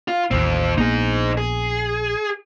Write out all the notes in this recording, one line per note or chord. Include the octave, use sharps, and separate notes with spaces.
F4
A1 D#2 F3 C4
A#1 A#3 B3 D#4 G#4
G#4